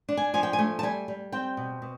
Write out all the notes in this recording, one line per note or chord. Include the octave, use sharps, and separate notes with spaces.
D4
G#5
F3 G#5
G5
G#5
A3
A5
G3 G#5
G3
C4 G5
B2
B2